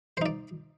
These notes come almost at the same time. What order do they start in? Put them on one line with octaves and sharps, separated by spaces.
C5 D#4 D5